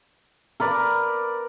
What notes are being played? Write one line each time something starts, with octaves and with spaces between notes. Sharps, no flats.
A#4 B4 D5